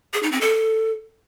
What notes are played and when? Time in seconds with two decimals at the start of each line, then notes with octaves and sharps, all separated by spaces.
0.13 G#4
0.23 D#4
0.32 C4
0.41 A4